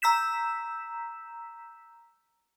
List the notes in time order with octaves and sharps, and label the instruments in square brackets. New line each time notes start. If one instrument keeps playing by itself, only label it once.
[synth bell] A#5 E6 G6 B6 E7